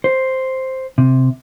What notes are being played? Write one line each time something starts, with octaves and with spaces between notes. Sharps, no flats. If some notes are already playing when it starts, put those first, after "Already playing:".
C5
C3